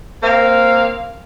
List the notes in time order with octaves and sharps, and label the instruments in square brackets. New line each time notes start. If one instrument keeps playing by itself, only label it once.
[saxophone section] A#3 C4 F5